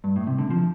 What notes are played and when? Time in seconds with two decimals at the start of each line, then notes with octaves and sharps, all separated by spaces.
0.04 G2
0.16 A2
0.27 C3
0.38 D3
0.50 F3